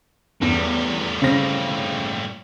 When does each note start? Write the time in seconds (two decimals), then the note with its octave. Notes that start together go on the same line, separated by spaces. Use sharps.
0.42 E2 A2 G3
1.22 C#3 C4 A#6